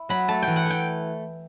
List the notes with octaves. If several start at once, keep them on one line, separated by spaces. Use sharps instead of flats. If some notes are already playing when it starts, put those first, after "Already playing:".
Already playing: E4
F#3 B5
A3 A5
E3 G5
F#5
A3
G5